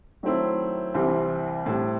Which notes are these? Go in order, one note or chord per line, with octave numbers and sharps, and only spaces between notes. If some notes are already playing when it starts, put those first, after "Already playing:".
D#3 F#3 A3 C4 E4
C2 C3 E3 G3 C4
A2 G3 C4